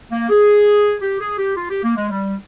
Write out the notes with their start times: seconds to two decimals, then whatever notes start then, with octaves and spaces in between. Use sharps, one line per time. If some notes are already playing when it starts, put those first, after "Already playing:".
0.11 A#3
0.30 G#4
1.02 G4
1.20 G#4
1.38 G4
1.56 F4
1.70 G4
1.83 A#3
1.96 G#3
2.10 G3